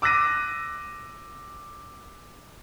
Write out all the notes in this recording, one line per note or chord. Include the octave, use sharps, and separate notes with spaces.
D6 E6 F#6 A#6 D#7